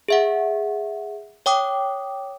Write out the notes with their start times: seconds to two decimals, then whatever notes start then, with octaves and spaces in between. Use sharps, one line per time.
0.08 G#4 E5 F#5
1.46 C#5 G5 D6 D#6